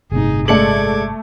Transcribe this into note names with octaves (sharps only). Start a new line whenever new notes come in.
G1 A2 C3 D#4 G#4
G#3 A3 A4 D5 D6 G#6 C#7 F#7